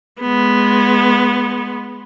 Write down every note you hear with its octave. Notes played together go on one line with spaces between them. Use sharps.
G#3 B3